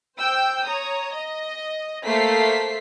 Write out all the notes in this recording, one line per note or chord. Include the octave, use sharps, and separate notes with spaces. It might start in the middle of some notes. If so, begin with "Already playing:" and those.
C5 G5 E6 G6
C#5 A#5 D#6
D#5
A3 A#3 A4 C5 B6 C7